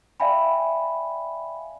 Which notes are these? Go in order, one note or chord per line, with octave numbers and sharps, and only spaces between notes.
D5 E5 F5 G5 G#5 B5